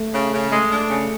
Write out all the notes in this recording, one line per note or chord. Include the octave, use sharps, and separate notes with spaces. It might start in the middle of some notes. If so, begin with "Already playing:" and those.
Already playing: A3
C#3
C#3
G#3 A3
D4
C#3